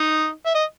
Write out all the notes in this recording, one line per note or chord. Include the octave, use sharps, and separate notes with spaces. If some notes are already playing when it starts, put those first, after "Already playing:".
Already playing: D#4 D#5
E5
D#5